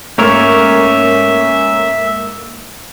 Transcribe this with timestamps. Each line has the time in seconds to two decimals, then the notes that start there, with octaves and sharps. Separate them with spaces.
0.18 G#2 A3 A#3 C#4 A#4 C#5 E5